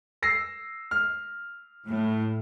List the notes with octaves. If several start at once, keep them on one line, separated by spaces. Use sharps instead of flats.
E6 A#6 C7
F6
A2